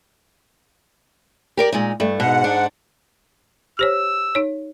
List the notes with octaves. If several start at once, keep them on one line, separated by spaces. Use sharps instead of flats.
G4 A#4 D5
A#2 G#3 D#4
G2 A3
G#2 B2 F#5
D4
G4 C5 C#5 E6
D#4 C#5